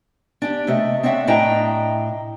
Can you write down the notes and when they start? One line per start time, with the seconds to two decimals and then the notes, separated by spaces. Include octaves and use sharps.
0.42 D4 G4
0.67 C3 A3 D#5 E5
1.03 C4 D4 C#5 E5 F#5
1.27 A2 D4 E4 D#5 G5 A#5